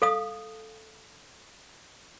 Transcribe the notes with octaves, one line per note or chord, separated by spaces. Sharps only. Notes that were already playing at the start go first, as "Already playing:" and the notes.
A4 F5 D#6